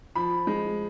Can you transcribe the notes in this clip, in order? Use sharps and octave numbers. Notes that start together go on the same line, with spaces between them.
F3 B5
G#3